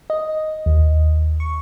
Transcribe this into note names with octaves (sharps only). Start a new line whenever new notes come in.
D#5
D#2
C#6